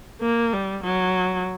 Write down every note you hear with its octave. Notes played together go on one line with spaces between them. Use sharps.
A#3
G3
F#3